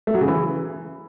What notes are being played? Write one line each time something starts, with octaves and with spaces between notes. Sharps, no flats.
A3
F#3
C#3
E3